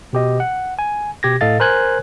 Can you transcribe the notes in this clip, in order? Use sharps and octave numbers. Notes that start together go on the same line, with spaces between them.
B2 G4 D#5
F#5
G#5
B2 G4 G#6 A#6
A2 A4 D#5 F5 A6
A#4 C5 G#5 F#6 G#6